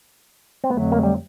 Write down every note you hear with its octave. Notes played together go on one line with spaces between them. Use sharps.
C4
F2 D3 F#3 A3 B3
A#3
G3